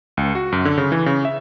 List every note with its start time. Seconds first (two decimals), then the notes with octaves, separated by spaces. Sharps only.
0.17 C#2
0.35 F#4
0.52 F#2
0.65 D3
0.78 C#3
0.92 E3
1.06 C#3
1.25 E5